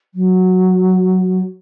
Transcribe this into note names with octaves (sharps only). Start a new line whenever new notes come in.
F#3